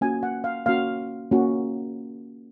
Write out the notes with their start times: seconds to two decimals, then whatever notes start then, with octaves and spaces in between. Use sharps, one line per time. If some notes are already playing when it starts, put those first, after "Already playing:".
0.01 A#3 C#4 F#4 G#5
0.23 F#5
0.44 F5
0.66 A#3 C#4 F#4 F5
1.31 A#3 C#4 F#4